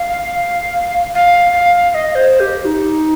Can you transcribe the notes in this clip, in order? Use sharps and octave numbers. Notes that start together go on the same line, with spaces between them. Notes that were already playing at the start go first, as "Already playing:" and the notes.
Already playing: F5
F5
F5
F5
D#5
C5
G4
D#4